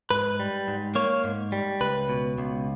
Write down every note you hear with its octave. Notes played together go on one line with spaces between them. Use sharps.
G#2 B4
G3
G#2
A#3 C#5
G#2
G3
C#2 B4
B2
C#2